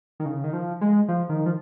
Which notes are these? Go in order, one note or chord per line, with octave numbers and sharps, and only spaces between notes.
D#3
C#3
D#3
F3
G#3
F3
D#3
F3